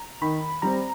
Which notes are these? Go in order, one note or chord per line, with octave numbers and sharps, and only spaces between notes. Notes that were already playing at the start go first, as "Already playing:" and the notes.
Already playing: A#5
D#3 B5
G3 C4 A#5